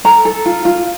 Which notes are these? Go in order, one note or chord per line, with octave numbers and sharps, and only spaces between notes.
A4 A#5
A4
F4
F4